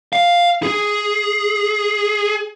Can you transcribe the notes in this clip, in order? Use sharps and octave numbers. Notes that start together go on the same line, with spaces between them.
F5
G#4